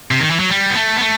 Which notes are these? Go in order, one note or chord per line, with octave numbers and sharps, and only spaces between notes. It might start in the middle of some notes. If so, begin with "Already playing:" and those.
C3
D#3
E3
F#3
G3
B3
A3
B3
A3